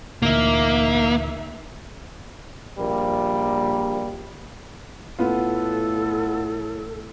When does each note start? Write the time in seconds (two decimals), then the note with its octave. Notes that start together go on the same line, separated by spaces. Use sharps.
0.22 D2 A#2 E3 A#3 D#4 E5
2.78 A#1 G3 A#3
5.19 A2 B3 F4 A4